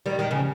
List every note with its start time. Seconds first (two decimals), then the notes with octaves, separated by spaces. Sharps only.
0.06 D#3 G3
0.19 D#3
0.31 C#3 F3